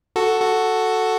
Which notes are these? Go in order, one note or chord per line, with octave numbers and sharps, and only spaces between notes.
F#4 A4
F#4 A4